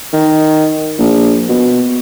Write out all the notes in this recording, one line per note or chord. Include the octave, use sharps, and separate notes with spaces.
D#3
A#1
B2